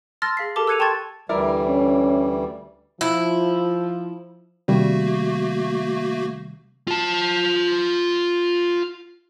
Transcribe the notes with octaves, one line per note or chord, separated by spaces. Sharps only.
A5 C6 E6 F6 A6 A#6
G#4 F5 B6 C7
G4 A4 A#4 A5 D6 G7
E6 F#6 G#6 C#7 D#7 F7
G5 A5 C6 C#6 G#6 A6
D2 E3 G3 E4 A#4 D5
C#4
F3 E4
C3 D#3 G3 A3 A#3 F#4
F4 A5